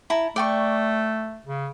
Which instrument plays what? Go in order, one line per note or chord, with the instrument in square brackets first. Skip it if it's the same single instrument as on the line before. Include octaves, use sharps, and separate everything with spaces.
[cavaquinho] E4 A5 A#5
[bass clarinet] A3 [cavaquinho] D5 G5 C#6
[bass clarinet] C#3